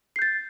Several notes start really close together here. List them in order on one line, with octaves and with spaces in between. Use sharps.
C7 G6 A6